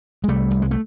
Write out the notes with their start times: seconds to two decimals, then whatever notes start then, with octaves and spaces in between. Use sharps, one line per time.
0.24 G#3
0.28 C2 G3 A3
0.51 C2
0.62 G#3
0.71 A3